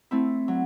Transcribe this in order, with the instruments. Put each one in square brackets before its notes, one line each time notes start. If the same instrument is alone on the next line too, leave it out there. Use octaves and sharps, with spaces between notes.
[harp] A3 C4 E4
F#3